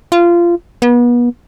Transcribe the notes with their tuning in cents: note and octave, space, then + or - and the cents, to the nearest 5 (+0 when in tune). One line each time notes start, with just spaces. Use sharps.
F4 -20
B3 -35